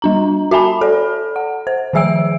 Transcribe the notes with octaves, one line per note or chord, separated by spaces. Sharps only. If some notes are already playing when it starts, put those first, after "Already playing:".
G3 D4 A#5
F#4 E5 G#5 A5 B5
A4 D5
F#5
C5
D#3 F3 G#4 E5 E6 D7